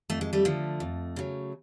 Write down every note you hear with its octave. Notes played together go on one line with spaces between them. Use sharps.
F2 A3
G#3
G3 A3
D3 F3
F2
C#3 F#3